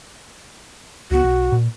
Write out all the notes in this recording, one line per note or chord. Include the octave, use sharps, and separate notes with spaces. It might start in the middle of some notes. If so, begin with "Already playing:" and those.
C#2 B3 F#4
B1
A#2